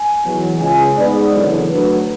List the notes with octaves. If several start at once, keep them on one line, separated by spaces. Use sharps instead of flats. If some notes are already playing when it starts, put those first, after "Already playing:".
Already playing: G#5
E2 B2 F#3
C#2 C#3 G#3 G#5
G#2 G#3 B3 D5
F#1 E2 D3 F#3
D2 D3 F#3 B4